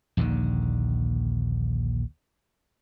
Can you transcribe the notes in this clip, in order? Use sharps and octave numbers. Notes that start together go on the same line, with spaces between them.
A#1 D#2 D3 D#3